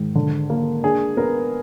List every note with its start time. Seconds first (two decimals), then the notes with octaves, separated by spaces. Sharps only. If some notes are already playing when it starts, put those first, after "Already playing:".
Already playing: G#2 D#3
0.15 D3
0.50 A#3
0.84 D4 G#4
1.17 B3 A#4